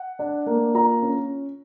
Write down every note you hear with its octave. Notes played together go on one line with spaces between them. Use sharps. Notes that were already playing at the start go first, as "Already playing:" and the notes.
Already playing: F#5
D4
A#3
F4 A#5
C#4